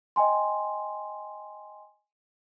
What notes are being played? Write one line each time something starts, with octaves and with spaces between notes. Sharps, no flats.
D#5 G5 G#5 C6